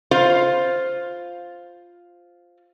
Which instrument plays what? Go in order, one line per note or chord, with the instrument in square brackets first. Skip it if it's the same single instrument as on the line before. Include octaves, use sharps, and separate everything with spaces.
[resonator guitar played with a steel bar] F4 C5 F5